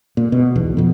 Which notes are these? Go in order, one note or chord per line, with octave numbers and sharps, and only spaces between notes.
A#2
B2
D1 B1 E2
F2 B2